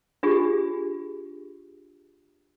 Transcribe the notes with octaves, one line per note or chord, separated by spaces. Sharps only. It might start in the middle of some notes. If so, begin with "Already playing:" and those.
D4 F4 G4 G#4